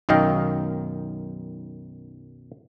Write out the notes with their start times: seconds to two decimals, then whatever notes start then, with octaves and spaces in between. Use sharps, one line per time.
0.09 B1 F#2 D#3 D#5 F5 G5